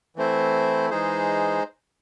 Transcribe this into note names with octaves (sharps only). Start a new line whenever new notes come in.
E3 A3 C4 E4 C5
E3 G#3 D#4 G#4 C5